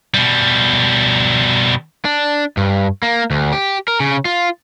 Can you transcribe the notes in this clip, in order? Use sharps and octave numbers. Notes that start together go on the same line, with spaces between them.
B2 G3
D4
G2
A#3
D2
G4
A#4
C#3
F4